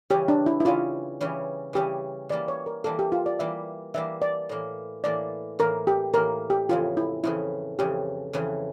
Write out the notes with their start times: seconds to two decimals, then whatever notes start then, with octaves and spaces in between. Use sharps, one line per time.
0.10 C#3 E3 G3 C#4 G4
0.28 D4
0.46 E4
0.60 E4
0.65 C#3 E3 G3 C#4 F4
1.20 C#3 E3 G3 C#4
1.73 C#3 E3 G3 C#4 G4
2.29 E3 G3 A#3 D5
2.48 C#5
2.66 A#4
2.84 E3 G3 A#3 A4
2.99 G4
3.12 F4
3.26 D5
3.39 E3 G3 A#3 E5
3.94 E3 G3 A#3 E5
4.22 D5
4.49 A2 E3 A#3
5.04 A2 E3 A#3 D5
5.59 A2 E3 A#3 A#4
5.87 G4
6.13 A2 E3 A#3 A#4
6.50 G4
6.69 F2 C#3 E3 F4
6.97 E4
7.24 F2 C#3 E3 E4
7.79 F2 C#3 E3 G4
8.33 F2 C#3 E3